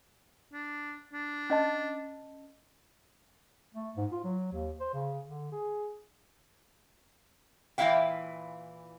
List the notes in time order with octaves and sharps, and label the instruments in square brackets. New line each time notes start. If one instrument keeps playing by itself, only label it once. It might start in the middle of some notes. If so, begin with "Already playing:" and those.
[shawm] D4
D4
[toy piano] C#4 D#5 A5
[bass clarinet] A3
G#2
F4
F#3
D#2
C5
C#3
D3
G#4
[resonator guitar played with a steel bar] A#2 E3 E4 E5 F5 G5